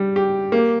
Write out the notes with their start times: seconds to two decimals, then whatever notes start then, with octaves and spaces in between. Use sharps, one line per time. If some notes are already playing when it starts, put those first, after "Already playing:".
Already playing: G3 G4
0.16 G4
0.52 A#3